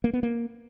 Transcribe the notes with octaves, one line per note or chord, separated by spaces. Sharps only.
A#3
B3
A#3